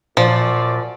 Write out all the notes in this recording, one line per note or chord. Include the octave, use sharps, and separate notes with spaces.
F#2 A#2 F3 D5